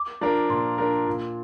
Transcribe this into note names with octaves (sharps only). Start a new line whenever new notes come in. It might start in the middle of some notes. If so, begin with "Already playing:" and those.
Already playing: D6
F3 D4 A#4
A#2 C6
F3 D4 A#4
A#2